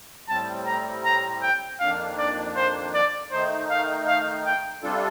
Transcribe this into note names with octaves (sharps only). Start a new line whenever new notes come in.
A2 G3 C4 A5
A#5
A#5
G5
F2 D#3 A#3 D4 F5
D5
C5
D5
D#3 A3 D#4 C5
F5
F5
G5
C3 G3 D4 F4 A4